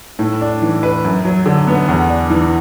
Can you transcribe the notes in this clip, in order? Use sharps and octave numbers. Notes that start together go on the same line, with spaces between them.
A2
D4
E3
B4
F#2
F#3
D3
B3
E2
D4
E3